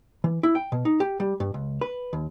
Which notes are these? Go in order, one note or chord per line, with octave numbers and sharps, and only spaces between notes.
E3
E4
G5
B2
D#4
G4
G3
G2
C#2
B4
D#2